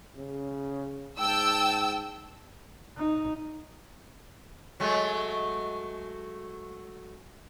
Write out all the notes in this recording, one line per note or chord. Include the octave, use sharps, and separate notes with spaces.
C#3
G#2 G5 A5 E6
D#4
F#3 G#3 A3